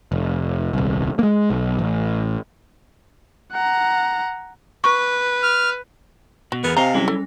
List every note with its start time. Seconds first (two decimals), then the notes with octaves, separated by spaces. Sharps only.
0.12 F1
0.73 D#1 C2
1.19 G#3 A#3
1.50 B1
1.79 A1
3.52 F#5 A#5
4.84 B4 C#6
5.43 F6
6.52 B2 F#4
6.64 E2 B3 G#4 A#4 A6 F7
6.77 C3 C5 D#5 F5 G#5 A#5
6.94 F#3 G3 C#4 E4 A#6
7.08 A4